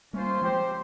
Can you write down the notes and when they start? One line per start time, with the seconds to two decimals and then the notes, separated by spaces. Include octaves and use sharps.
0.13 G3 A#3 C#4 F4 C5
0.42 F3 G#3 C4 G4 C5